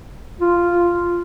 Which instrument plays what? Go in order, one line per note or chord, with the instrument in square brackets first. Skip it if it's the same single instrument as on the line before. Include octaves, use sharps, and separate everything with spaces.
[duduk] F4